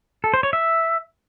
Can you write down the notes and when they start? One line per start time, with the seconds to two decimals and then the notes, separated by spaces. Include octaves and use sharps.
0.24 A4
0.34 C5
0.43 C#5
0.53 E5